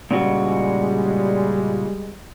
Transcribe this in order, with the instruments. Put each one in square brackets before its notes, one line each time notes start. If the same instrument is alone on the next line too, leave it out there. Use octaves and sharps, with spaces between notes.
[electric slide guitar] A#2 C#3 F#4 [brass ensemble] G3 G#3